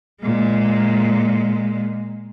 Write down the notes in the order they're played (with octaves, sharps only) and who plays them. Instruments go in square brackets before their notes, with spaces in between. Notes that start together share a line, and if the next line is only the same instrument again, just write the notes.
[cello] A#2 G#3